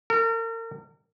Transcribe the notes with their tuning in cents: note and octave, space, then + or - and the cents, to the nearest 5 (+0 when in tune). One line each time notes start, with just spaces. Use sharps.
A#4 -40